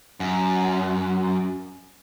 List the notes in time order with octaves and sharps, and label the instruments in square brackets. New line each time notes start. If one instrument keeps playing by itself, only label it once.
[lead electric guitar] F#2